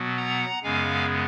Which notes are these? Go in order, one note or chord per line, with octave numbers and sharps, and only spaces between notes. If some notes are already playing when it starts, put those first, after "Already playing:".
Already playing: B2 F#3 B3
F#5 A#5
F#2 C#3 G#3 B3 F5 G#5